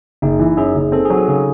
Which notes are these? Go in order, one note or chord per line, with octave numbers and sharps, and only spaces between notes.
F#1 D#4
E3
F#2 G#4
F#1
C4 A4
F#3 G#4
F#4
C#3 G#4